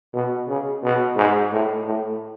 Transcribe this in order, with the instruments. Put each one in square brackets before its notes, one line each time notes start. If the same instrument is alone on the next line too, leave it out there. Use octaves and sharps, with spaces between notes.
[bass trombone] B2
C#3
B2
G#2
A2
A2